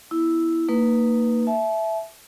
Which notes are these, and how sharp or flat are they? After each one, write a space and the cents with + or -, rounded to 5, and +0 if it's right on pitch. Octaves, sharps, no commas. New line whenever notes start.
B3 +0 E4 +0
A#3 -20 D#4 +0 B4 -5
E5 +0 A5 -35